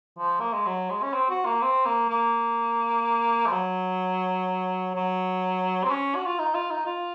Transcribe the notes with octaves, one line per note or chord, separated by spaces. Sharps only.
F3
A#3
G#3
F#3
G#3
C#4
C4
F#4
A#3
C4
A#3
A#3
F3
F#3
F#3
C4
C#4
F#4
F4
D#4
F4
D#4
F4